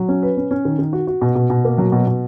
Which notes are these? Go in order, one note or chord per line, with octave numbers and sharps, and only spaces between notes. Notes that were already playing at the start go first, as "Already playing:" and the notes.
Already playing: F#3
C#4
B4
C#4
C#4
D#3
D#3
F#4
F#4
B2
B2
B2
A#3
F#3
B2
B2